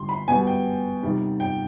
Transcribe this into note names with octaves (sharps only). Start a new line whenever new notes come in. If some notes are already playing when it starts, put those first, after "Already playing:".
Already playing: D3 G3 C6
B5
B2 G3 G#5
G5
C3 D#3 G3
G5